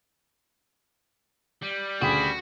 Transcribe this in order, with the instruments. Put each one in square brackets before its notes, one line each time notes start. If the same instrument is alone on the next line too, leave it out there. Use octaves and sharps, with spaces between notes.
[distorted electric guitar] G3
[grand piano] D2 C#3 G5 [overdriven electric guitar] F#4 [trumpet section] G#4 B5